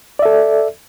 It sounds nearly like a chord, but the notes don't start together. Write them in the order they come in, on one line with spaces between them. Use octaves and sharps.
D5 E5 A4